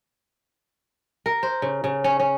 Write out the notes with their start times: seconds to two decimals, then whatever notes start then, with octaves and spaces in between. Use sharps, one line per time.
1.26 A#4
1.43 C5
1.62 C#3
1.84 C#3
2.04 C#4
2.20 C#4